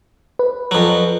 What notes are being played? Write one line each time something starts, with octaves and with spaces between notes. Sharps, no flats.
B4
F2 F#3